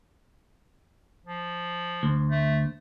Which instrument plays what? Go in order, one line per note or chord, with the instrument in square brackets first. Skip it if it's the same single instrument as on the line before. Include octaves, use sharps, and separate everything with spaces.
[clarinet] F3
[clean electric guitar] D2
[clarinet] A3